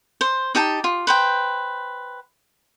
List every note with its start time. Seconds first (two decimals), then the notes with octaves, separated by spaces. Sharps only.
0.21 C5
0.55 D#4 G4 G5 A5
0.84 F4
1.07 B4 C5 G5